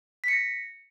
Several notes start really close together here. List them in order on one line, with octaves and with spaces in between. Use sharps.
B6 C#7 A#6